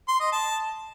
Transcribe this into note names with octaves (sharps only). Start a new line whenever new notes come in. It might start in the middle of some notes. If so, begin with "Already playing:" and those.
C6
D#5
A5